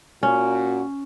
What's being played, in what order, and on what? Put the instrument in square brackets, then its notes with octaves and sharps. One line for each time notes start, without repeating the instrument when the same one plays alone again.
[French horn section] A#2 F#4 [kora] C#4